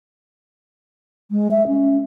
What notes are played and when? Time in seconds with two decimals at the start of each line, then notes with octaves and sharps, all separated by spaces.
1.31 G#3
1.51 E5
1.67 C#4